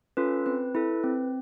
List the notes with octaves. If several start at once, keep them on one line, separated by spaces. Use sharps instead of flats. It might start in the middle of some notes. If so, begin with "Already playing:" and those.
C#4 F4 A4 B4
C4 B4
E4 A4
C4